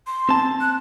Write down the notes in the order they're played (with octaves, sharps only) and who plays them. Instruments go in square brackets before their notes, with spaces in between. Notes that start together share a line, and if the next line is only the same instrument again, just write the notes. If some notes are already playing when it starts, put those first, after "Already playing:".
[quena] C6
[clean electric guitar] C4 A5
[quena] F#6